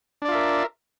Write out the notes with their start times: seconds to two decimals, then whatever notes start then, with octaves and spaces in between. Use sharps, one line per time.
0.22 D4
0.25 D5
0.28 F4
0.32 E5
0.35 A#4